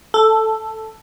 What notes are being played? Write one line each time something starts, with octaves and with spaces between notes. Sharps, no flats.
A4